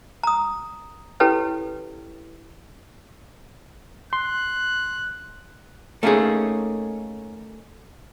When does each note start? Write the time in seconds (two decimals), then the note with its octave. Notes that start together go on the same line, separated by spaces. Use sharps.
0.23 A#5 D#6
1.20 C#4 E4 G4 A4 B4 C#5
4.13 C6 F#6
6.03 A3 A#3 C#4 D#4 G#4